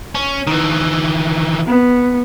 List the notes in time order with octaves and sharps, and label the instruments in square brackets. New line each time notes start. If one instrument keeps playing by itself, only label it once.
[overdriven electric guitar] C#4
D#3 E3
[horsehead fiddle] B3